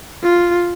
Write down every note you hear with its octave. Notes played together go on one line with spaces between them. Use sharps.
F4